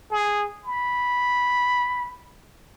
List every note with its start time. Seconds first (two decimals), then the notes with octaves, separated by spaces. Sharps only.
0.11 G#4
0.64 B5